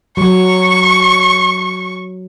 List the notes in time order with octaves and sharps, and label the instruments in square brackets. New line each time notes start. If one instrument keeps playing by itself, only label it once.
[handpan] F#3 [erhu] C#6